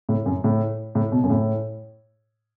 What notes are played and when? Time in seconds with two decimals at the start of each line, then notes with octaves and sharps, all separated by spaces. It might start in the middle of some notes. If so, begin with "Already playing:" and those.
0.09 A2
0.26 F#2
0.44 A2
0.95 A2
1.12 B2
1.24 F#2
1.30 A2